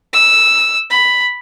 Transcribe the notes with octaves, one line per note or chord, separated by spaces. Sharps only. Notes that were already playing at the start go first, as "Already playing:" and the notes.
E6
B5